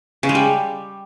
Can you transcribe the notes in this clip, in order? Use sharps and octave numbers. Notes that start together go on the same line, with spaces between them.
C#3
G#3
G3